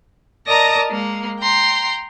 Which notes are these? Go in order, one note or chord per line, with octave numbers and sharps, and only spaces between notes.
A#4 D5 D#5 A5 A#5 A#6
G#3 A#3
G5 A#5 C6